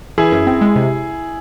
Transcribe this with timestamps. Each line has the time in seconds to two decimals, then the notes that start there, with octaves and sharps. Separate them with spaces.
0.18 E3 E4 G#4
0.32 F#2
0.47 C4
0.61 G#3
0.76 C3